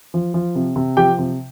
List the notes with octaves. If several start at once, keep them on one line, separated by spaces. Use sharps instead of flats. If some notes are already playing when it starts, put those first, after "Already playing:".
F3
F3
C3
C3
F3 G4 G5
C3